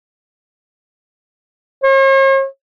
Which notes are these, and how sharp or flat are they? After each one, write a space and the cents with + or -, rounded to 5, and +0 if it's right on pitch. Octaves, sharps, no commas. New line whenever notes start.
C#5 -45